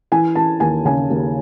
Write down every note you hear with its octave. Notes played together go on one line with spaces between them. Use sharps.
E3 G#5
E3 A5
D#2 G#5
C#3 G#5
D#2